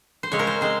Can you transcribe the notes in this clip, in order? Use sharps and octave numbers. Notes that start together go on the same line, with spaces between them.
C5
C#3 G#3 C4 C#5
A#4
C5
G#3 C4 C5